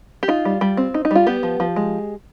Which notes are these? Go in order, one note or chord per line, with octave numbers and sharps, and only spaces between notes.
G4
D#4 F4
G3
G3
C4
D#4
D#4
G3 F4
B3 G4
F3
F3
G#3